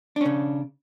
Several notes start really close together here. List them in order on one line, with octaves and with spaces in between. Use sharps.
D4 C#4 C#3